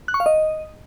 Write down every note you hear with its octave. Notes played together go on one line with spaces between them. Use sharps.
F#6
C#6
F5
D#5